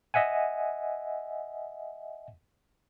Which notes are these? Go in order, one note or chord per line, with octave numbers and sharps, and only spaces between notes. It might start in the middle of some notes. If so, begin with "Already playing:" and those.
D#5 E5 F#5 G#5